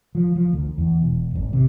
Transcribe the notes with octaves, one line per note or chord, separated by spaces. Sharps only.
F3
F3
D2
E2
E1
G#1
C3